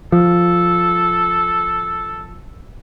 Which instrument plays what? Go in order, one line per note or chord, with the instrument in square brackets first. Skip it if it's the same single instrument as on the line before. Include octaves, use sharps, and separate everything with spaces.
[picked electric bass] F3 [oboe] A4